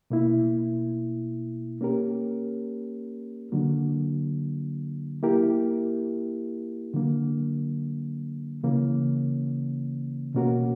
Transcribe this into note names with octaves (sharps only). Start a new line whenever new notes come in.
B2 A#3 E4
A#3 C#4 G4 A#4
D3 F#3 A#3
A#3 E4 G4 A#4
D3 F#3 A#3
C#3 E3 A#3 C#4
B2 A#3 C#4 F#4 A#4